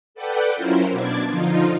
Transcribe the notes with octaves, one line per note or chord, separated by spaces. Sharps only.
A4 B4 D5 F#5 G5
F#3 C#4 E4 F4 A#4 C5
B2 D4 D5 G#6 A6
D3 F3 D#4 F4